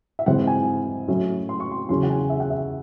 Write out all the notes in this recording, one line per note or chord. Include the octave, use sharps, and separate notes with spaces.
E5
G#2 E3 C4 F#5
G#5
A2 F#3 A3 C#4 E4
C6
C#6
C6
E2 C#3 F#3 C#4 C6
F#5
G#5
E5
F#5
E5